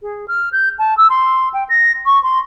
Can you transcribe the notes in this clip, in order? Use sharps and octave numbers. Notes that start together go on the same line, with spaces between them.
G#4
F6
G6
A5
E6
C6
G5
A#6
C#6
C6